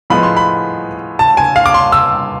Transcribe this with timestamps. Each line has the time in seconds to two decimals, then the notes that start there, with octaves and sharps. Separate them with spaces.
0.10 A2 F3 G#3 B3 B5
0.23 C6
0.37 B5
1.19 A5
1.37 G#5
1.56 F5
1.66 D6
1.74 C6
1.92 E6